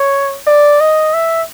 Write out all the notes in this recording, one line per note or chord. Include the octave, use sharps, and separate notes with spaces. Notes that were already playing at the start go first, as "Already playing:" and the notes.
Already playing: C#5
D5
D#5
E5